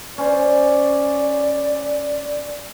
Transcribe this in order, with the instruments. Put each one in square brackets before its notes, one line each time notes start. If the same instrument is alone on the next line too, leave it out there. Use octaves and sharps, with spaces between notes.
[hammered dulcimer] C#4 C5 [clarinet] D5